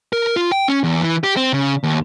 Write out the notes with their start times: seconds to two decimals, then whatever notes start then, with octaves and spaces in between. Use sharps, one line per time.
0.13 A#4
0.36 F4
0.52 G5
0.68 C#4
0.84 E2
1.01 E3
1.23 G4
1.36 C4
1.53 C#3
1.83 D#2